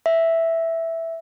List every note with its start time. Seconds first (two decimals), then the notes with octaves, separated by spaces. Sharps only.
0.06 E5